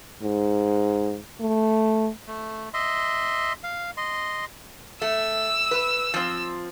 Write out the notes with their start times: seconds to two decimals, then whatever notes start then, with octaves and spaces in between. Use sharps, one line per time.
0.23 G#2
1.40 A3
2.27 A3
2.74 D#5 E5 C6
3.63 F5
3.97 D#5 C6
5.02 A3 E6
5.71 B4
6.14 F3 C4